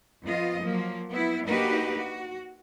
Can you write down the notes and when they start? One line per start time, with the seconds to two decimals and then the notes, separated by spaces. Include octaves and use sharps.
0.24 F2 B3 F4 D#5
0.60 F3 F#3 A#3
1.09 B3 E4
1.47 A#3 D4 D#4 F#4 G4 B4
1.96 F#4